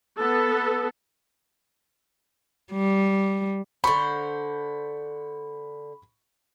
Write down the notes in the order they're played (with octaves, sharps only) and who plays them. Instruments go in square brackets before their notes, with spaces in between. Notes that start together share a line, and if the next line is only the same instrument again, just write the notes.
[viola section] B3 A4
[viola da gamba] G3
[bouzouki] D3 C5 [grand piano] B5 C#6